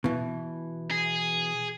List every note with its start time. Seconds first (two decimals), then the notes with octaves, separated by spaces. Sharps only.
0.04 B2 E3
0.91 G#4